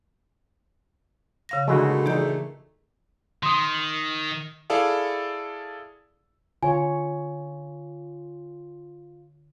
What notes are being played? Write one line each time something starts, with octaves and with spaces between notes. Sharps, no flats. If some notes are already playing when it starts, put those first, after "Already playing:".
C#3 F5 A#6
A#2 D3 F#3 G#3 A3 E4 F#4
E3 D#4 G#4 D5 G6
D#3 C6 D#6
F#7
E4 G#4 A4 D5 F5
D3 F4 C#5 G#5